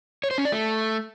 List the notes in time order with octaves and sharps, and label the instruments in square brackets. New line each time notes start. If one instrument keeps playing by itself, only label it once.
[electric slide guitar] C#5
C5
C#4
D5
A3